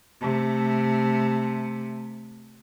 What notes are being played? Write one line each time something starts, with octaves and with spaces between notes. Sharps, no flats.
C3 A3